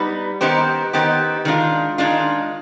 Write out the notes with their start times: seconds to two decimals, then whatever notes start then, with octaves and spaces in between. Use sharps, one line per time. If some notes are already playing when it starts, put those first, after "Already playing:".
Already playing: G3 B3 D#4 B4
0.41 D#3 B3 D#4 G4 C5
0.93 D#3 B3 D#4 G4 C5
1.45 D#3 G#3 D4 F4
1.98 D#3 G#3 D4 F4